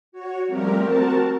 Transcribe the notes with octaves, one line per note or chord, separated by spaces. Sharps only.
F#4 C#5
F3 G3 A3 C4 G4 A#4
C4 F#4 A#4 A5